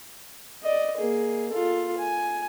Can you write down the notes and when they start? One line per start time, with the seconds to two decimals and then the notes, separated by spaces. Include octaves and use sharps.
0.63 D5 D#5
0.97 A#3 G#4
1.50 F4 A4
1.98 G#5